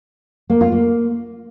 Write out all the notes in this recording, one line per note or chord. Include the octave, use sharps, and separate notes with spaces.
A#3
F4
A#3